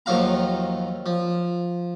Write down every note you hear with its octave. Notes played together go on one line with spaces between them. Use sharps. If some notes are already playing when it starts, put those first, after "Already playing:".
D#2 D#3 F3 F#3 F5 A#5
F3